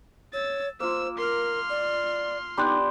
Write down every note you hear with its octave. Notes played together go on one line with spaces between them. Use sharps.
C#5 E6 A6
A#3 F4 C5 E6
A#4 C6 F6
D5
B3 D4 D#4 G4 B5 C6 F#6